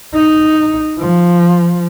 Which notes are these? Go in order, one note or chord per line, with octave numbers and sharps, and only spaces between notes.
D#4
F3